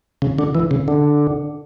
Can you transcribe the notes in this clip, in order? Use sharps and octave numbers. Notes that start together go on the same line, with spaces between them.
C#3
D3
E3
C#3
D3